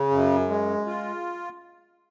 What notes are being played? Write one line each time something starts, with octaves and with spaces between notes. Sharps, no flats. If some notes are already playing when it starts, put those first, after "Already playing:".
Already playing: C#3
F#2
G#3
F4